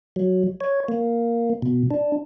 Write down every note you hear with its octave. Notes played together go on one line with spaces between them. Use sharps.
F#3
C#5
A#3
B2
D4